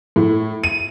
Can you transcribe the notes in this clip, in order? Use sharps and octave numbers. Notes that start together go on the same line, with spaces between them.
A2
D#7